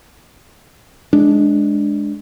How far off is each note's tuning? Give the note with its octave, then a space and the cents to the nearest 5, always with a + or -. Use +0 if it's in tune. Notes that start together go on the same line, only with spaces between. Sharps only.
G#3 +10 D4 +0